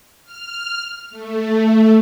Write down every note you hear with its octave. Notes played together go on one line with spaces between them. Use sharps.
F6
A3